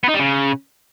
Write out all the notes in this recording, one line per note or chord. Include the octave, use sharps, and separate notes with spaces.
B3
D#4
G3
C#3